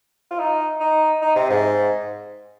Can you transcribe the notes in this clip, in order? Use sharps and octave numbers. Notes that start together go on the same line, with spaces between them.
F4
D#4
D#4
D#4
C3
G#2